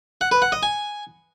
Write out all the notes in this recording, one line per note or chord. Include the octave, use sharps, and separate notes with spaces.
F#5
B4
F#5
D#5
G#5